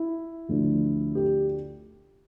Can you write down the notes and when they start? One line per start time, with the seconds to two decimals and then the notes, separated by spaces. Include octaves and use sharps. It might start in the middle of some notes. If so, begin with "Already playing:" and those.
Already playing: E4
0.49 D2 D3 F3
1.15 G4